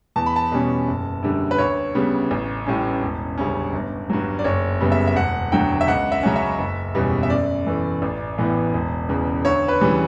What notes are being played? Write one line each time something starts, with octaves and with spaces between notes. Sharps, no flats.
E2 A5
B5
A5
B2 G3 C#4
F#1
F#2 D3 G3
B4
D2 C#5
C#3 G3 B3
A1
A2 G3 C#4
E1
D2 C#3 G3 C#4
G1
G2 F#3
D5
F#1 C#5
F#2 C#3 G3 B3
E5
E5
E1 F#5
D2 D3 F#3 G5
E5
C#2 F#5
E5
C#3 F#3 C#4
E5
F#1
E2 B2 G3 C#4
E5
F#2 D5
E3 A3
A1
A2 E3 B3
E1
E2 C#3
D2 C#5
B4
C#3 E3 G3